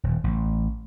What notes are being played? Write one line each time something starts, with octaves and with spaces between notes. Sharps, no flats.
D#1
A1